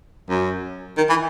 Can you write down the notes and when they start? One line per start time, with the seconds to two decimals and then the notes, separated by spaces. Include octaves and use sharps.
0.29 F#2
0.97 D#3
1.09 E3